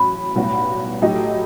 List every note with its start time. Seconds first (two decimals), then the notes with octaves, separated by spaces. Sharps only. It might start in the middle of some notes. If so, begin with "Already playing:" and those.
Already playing: A1 A2 F#3 B4
0.35 B1 A2 G3 B3 F#4
1.02 A2 F#3 A3 D#4 G4